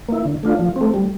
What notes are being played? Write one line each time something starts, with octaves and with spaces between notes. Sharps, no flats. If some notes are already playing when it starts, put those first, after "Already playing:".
A#3 E4
D3
A3 D4 F4
F3
C4
A3
G3